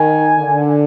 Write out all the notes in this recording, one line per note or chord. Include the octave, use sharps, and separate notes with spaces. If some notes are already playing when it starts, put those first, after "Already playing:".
Already playing: D#3 G#5
D3